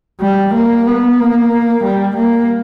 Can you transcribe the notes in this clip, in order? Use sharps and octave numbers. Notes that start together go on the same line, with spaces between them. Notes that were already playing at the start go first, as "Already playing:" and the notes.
G3
A#3
B3
A#3
G3
A#3